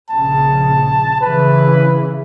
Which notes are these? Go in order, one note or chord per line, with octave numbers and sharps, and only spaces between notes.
A#1 C#3 A5
C#3 E3 B4